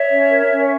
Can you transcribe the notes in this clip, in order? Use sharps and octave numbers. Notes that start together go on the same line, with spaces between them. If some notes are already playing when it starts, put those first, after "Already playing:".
Already playing: C#5 E5
C#4
A#4
C#4